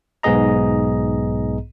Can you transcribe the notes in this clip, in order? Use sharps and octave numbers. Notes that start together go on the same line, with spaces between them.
B1 G#2 B3 G#4 D#5 A#5